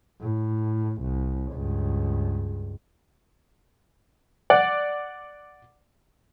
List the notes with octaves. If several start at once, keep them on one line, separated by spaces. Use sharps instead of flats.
A2
C2
C#2 G2
D5 F#5